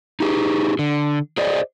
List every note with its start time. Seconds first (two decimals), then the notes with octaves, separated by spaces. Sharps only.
0.20 D#4 G4 G#4
0.79 D3
1.38 G#4 C5 D5 D#5